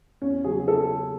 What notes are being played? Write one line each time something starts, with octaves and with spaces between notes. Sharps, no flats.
E2 C#4
C#3 F#3 G#4
A4